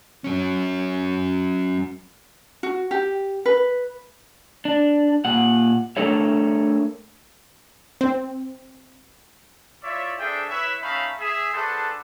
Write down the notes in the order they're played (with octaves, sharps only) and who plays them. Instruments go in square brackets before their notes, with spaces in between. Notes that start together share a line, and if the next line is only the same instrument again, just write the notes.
[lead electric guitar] F#3 C#4
[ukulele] F#4
G4
B4
[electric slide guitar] D4
A#2 F#5
A3 D4 A4 A#4 C#5 E5
[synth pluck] C4
[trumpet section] E4 F4 C#5 D5 E5
C4 D4 G#4 A4 E5 G5
E4 B4 C#5 E5
A3 C#4 D#4 E5 F5 B5
G#4 E5
D4 F#4 G#4 A4 B4 C5